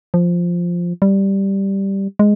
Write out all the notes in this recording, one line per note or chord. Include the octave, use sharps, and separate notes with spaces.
F3
G3
G#3